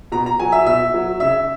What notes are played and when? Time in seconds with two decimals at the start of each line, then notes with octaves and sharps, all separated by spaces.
0.12 B2 A#5
0.26 A#5
0.40 F#3 G#5
0.52 E5
0.66 B2 E5
0.94 F#3
1.20 C#3 E5